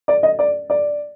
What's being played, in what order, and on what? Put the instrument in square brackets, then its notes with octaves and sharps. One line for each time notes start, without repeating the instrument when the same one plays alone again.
[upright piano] D5
D#5
D5
D5